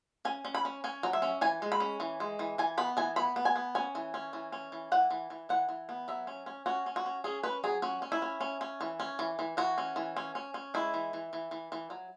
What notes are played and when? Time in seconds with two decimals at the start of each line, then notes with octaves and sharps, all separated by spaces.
0.25 C#4 G#5
0.45 C#4
0.54 B5
0.65 C#4
0.84 C#4 G#5
1.03 F#3
1.13 E5
1.22 C#4
1.41 E3 G#5
1.62 G#3
1.72 B5
1.80 C#4
2.00 E3
2.20 G#3
2.39 E3
2.58 E3 G#5
2.78 B3 B5
2.97 E3 G#5
3.16 B3 B5
3.36 B3
3.45 G#5
3.56 B3
3.75 C#4 G#5
3.95 E3
4.14 C#4
4.33 E3
4.52 C#4
4.72 E3
4.92 E3 F#5
5.11 E3
5.30 E3
5.49 E3 F#5
5.69 E3
5.89 B3
6.08 F#3 E5
6.27 C#4
6.46 C#4
6.66 C#4 F#4
6.86 C#4
6.96 F#4
7.06 C#4
7.24 C#4 G#4
7.43 C#4 B4
7.64 F#3 G#4
7.82 C#4 F#4
8.02 C#4
8.12 E4
8.22 C#4
8.41 C#4
8.61 C#4
8.81 E3
9.00 C#4
9.19 E3
9.39 E3
9.57 E3 F#4
9.78 C#4
9.96 E3
10.17 C#4
10.35 C#4
10.54 C#4
10.74 G#3 E4
10.94 E3
11.13 E3
11.33 E3
11.51 E3
11.72 E3
11.90 F#3